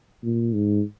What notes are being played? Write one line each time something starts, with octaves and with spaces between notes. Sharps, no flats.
A#2
G#2